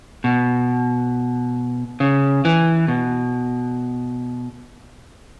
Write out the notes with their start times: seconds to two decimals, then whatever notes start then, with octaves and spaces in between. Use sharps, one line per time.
0.24 B2
2.00 C#3
2.45 E3
2.88 B2